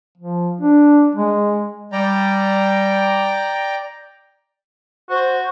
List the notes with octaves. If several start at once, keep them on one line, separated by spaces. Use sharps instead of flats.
F3
D4
G#3
G3 D5 G5 A#5
F#4 C5